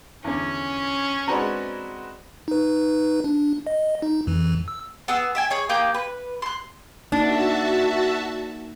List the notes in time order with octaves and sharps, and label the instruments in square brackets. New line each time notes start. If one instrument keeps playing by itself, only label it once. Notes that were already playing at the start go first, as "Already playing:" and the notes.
[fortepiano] E2 D3 [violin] C#4
[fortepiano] G#3 D4 A#5 [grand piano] C4 F#4 B4
[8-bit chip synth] D#4 B4
D4
D#5
D#4
F2 E3
E6
[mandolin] B3 G#4 E6
E5 G5 G#5
G#4 C#5 G#5
A#3 G4 D#6 G6
B4
C6 F#6
[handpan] A#3 D#4 [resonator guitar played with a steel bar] D4 [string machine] F#4 E5 A5